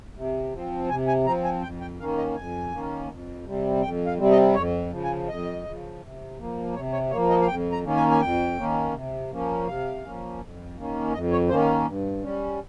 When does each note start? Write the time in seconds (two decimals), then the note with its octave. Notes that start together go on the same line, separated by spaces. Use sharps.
0.17 C3
0.53 F3 C4
0.90 C3 G#5
1.08 G#5
1.26 F3 C4 A#5
1.44 G#5
1.62 F2 G5
1.81 G5
1.99 D#3 A#3 C#4 F5
2.18 D#5
2.36 F2 G#5
2.73 D#3 A#3 C#4
3.09 F2
3.45 C3 G3 C4
3.82 F2 G5
4.06 F5
4.19 C3 G3 C4
4.31 D#5
4.55 F2 C#5
4.92 C#3 F3
5.04 G#5
5.28 F2 D#5
5.65 C#3 F3
6.02 C3
6.38 F3 A#3
6.75 C3 C#5
6.93 C#5
7.11 A#3 C#5
7.15 F3
7.30 D#5
7.42 F5
7.48 F2 G5
7.72 A#5
7.84 D#3 A#3 C#4
7.96 G#5
8.11 G#5
8.21 F2 G5
8.57 D#3 A#3 C#4
8.94 C3
9.31 F3 A#3 C#4
9.67 C3 F5
10.04 F3 A#3 C#4
10.41 F2
10.77 D#3 A#3 C#4
11.13 F2 D#5
11.32 C#5
11.49 D#3 A#3 C#4 C5
11.86 G2
12.23 G3 C#4